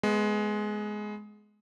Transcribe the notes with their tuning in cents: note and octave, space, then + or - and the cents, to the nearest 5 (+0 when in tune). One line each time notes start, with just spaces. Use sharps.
G#3 +15 B3 +0